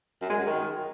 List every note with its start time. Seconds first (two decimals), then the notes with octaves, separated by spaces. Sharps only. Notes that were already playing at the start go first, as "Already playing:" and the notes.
0.21 F#2
0.30 G#3
0.38 F#2
0.46 D#3